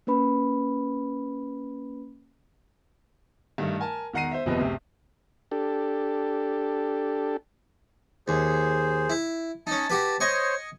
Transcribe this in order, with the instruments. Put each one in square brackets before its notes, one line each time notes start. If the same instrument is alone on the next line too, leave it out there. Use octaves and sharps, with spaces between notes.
[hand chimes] A#3 C#4 B4 B5
[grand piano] G2 D#3 A3
A#4 G#5 A5
E1 D#3 F#5 A#5 C7 D#7
C5 E5
F#1 E2 C3 F3 B4 D#5
F#1 D2 C3
[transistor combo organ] D4 G4 A4
[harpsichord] D#2 [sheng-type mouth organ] G#4 C5
[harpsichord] E4
[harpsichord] C#4 D#4 [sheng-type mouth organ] A5
[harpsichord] F#4 G4 B4
[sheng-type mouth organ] C5 C#5 [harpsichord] D#5 G#5 C#6